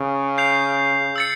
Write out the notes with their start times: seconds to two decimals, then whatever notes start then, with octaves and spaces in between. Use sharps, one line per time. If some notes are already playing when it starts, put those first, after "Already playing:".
Already playing: C#3
0.38 G6 C7 F7
1.16 E6 A6 C#7